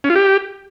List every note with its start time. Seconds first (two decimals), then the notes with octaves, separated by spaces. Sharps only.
0.04 C#4
0.10 F4
0.15 G4